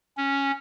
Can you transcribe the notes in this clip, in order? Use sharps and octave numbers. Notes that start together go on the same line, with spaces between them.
C#4